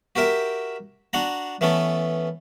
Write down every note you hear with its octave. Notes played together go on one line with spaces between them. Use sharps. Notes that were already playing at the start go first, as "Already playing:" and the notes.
F#4 G4 A#4 E5 G5
D4 F#4 F#5 A#5
E3 A3 B3 C#4 A4